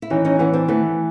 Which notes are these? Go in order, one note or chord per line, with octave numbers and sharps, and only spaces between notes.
E4
E3 C#4 D#4
C#4 D#4
E3 B3 C#4
C4 D4
E3 A3 B3